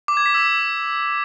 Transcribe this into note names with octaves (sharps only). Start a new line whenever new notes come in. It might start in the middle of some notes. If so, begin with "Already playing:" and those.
D6
G#6
B6
E6